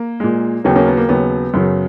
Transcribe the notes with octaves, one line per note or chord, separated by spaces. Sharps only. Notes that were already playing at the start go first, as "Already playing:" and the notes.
Already playing: A#3
A#2 G#3
D#2 C#3 F#3 B3
A#3 C#4
B3
A#3
D#2 C#3 F#3 B3
F#2 C#3 F#3